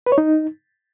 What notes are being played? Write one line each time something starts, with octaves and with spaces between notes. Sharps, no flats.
B4
C#5
D#4